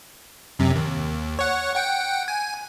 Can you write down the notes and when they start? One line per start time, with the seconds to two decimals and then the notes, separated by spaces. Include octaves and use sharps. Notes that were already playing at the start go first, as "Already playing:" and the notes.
0.59 F#2 C3
0.76 D#2
1.39 C#5 F#5
1.75 F#5 G5
2.28 G#5